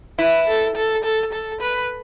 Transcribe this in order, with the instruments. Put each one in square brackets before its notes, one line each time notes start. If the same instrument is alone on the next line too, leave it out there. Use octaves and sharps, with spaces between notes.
[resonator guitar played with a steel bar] E4 [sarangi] B4
[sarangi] A4
A4
A4
A4
B4